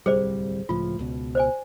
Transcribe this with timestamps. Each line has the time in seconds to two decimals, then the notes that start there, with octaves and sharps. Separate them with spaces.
0.06 D1 C2 G3 G#4 C5 D5
0.69 C#2 A2 F3 F4
0.99 C#2 B2
1.35 C5 D5 G#5